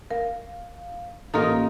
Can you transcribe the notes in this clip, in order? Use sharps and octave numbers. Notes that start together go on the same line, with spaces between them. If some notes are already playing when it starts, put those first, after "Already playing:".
A#4 F5
A1 A#3 C#4 D#4 F4 A4 A#4 D#6